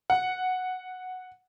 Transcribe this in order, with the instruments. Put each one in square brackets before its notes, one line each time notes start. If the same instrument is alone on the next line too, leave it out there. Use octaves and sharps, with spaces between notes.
[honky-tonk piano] F#5